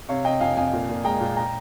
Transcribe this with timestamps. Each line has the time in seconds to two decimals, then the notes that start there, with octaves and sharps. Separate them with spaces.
0.09 C3 C#5 F5
0.25 C3 D#5 G5
0.41 F2 F5 G#5
0.57 F2 F5 G#5
0.73 A#2
0.89 A#2
1.04 G#3 G5 A#5
1.21 A#2
1.37 G5 A#5